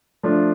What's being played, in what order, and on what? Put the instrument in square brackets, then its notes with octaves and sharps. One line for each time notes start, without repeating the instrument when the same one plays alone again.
[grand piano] F3 A3 D4 F4